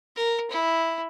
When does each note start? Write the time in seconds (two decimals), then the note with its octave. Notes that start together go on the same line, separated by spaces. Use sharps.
0.16 A#4
0.50 E4